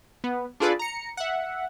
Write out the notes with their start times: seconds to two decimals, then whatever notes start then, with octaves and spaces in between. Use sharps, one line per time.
0.24 B3
0.60 D4 F4 G#4 A4 B4 D5
0.79 A#5 C#7
1.17 E5 F#5